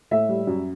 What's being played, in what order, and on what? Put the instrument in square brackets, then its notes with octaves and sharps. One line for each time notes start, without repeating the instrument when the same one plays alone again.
[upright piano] A2 E5
G3
F#2